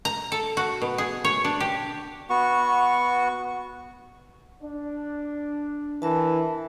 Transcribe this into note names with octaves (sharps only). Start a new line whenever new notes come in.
A#5
A4
F#4
B2
G#4
C#5
D4
G4
B3 F#4 C#6
D4
E3 A#4 E5 A5